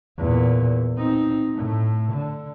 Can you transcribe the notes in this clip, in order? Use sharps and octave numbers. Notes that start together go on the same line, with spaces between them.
E2 A#2
C4 D#4
A2 A3
D3